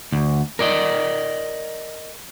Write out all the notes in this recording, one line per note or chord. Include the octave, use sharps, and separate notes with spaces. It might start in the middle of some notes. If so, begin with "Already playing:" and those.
D2
A#4 D5 D#5